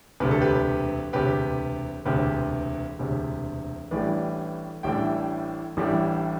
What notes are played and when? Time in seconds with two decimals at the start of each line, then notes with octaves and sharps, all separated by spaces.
0.20 E1 D2 C3 B4
0.31 A4
0.41 G4 B4
1.13 E1 D2 C3 G4 B4
2.05 E1 D2 C3 G4 B4
2.99 E1 D2 C3
3.91 A1 A2 E3 G3 D4 B4 D5
4.83 A1 A2 E3 G3 D4 E5 G5
5.77 A1 A2 E3 G3 D4